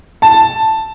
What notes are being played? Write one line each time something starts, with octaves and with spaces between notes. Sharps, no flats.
A5